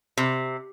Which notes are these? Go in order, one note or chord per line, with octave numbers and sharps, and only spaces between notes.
C3